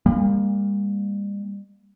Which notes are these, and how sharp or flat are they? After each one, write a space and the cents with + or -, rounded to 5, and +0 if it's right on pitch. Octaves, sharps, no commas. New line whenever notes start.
G3 +45 A#3 +0